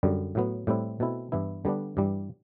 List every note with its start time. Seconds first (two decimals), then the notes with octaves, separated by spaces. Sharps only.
0.03 F#2 D3 G3
0.35 A2 F#3 B3
0.67 A2 G3 C4 E4
1.00 B2 A3 C4 E4
1.32 G2 E3 B3 E4
1.65 D3 G3 B3 D4
1.97 G2 E3 G3